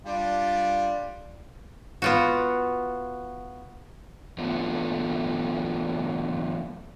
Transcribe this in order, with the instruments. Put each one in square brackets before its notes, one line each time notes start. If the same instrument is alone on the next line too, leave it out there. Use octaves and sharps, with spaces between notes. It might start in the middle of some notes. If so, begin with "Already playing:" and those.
[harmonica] G3 D4 F4
[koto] B3 F4 F#4
[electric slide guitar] E3 F#3 A3 B3 D4 F4